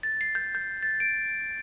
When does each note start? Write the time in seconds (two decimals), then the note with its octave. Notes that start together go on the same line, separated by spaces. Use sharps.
0.03 A6
0.21 C7
0.35 G6
0.55 G6
0.83 A6
1.00 D7